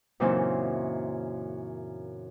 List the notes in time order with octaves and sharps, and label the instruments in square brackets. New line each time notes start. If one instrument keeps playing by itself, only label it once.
[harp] F#2 A#2 C#3 E3 C4 D#4